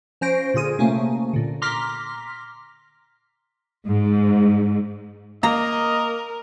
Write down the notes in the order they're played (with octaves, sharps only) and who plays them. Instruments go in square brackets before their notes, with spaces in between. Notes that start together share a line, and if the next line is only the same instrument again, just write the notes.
[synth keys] F3 C#4 C5 A#6 D7
A#2 D3 F4 G#4 D#7
C3 A3 A#3 C#4
A#2 D3
A#5 C6 D6 F6 A#6 B6
[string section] G#2
[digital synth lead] A#3 [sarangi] A#4 [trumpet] D#5 [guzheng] A#5